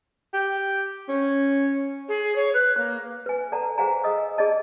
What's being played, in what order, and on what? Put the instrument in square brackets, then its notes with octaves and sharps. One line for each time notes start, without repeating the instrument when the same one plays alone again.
[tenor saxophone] G4
C#4
[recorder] G#4
C#5
B4
A#3
[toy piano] B4 G#5
A4 D5 F#5 A5 A#5
G#4 C5 F5 F#5 G#5 A#5
D#5 D#6 E6
G#4 D5 D#5 A5